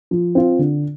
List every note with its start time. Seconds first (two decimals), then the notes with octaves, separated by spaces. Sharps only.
0.11 F3
0.35 C4 F4
0.59 D3